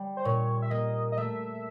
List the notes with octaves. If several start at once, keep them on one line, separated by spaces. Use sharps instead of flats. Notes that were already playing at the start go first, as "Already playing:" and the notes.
Already playing: G3
C5
A#2 C#5
E5
A#3 D#5
D#5
A3 E5